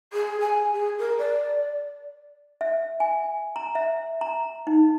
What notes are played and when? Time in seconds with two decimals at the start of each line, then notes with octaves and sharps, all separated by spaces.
0.13 G#4
0.40 G#5
0.73 G#4
0.99 A#4
1.18 D5
2.61 E5
3.00 G#5
3.56 A#5
3.75 E5
4.21 A#5
4.67 D#4